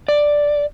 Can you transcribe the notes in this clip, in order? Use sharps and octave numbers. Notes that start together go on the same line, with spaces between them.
D5